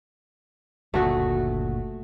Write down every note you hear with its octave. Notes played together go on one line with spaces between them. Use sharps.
F#1 D2 A#2 A3 F#4 F#5